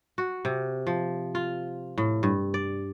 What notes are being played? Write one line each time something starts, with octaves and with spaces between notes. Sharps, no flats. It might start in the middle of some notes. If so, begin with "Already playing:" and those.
F#4
C3
F3
F4
A2
G2
D5